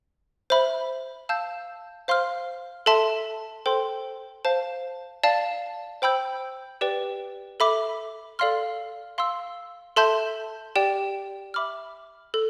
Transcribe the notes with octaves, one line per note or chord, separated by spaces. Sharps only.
C5 E5 B5
F5 A5 E6 G6
C5 F5 C6 F6
A4 E5 A5 C6
A4 C5 G5 C6
C5 F5 A5
D5 F5 A5
C5 G5 B5 E6 G6
G4 B4 D5 G5
A4 E5 B5 D6
A4 D5 F5 C6 F6
F5 C6 E6
A4 E5 A5 C6 G6
G4 D5 G5
E5 B5 D6 F6
A4